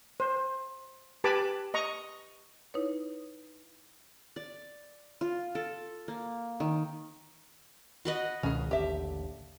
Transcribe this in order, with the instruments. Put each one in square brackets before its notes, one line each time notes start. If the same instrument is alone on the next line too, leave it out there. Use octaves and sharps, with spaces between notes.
[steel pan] C5
G4 B4 G#5 A5 B5 D6
D#5 A#5 C#6
[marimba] D#4 E4 B4 C#5
[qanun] D5
F4
A4
A#3
D#3
F#4 B4 D#5
[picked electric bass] C#2 B2 D#3 [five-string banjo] C#4 G#4
[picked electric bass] A1 D#2 D3 [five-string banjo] G4 E5